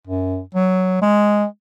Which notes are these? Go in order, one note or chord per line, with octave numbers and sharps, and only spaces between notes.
F#2
F#3
G#3